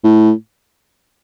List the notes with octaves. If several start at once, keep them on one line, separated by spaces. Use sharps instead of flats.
A2